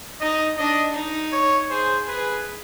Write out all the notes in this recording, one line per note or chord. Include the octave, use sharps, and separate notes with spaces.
D#4 D#5
D4 D#5
D#4
C#5
G#4 C5
G#4 B4